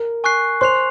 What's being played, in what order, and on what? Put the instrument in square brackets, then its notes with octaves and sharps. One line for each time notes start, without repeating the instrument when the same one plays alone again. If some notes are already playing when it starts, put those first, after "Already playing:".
Already playing: [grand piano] A#4
[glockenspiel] G#5 C#6 F#6 C7
[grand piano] C5 [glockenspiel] C6 F#6 C7 F7